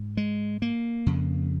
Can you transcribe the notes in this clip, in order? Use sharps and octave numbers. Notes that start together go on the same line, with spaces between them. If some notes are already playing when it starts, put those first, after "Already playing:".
Already playing: G#2
G#3
A#3
F2 C#3